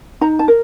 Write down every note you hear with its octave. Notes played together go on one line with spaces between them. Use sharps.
D#4 A#5
A5
A#4